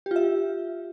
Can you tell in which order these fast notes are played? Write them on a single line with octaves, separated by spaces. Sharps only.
G4 F4 E5